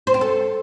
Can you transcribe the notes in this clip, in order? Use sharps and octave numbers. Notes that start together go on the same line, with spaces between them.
C5
C4
A4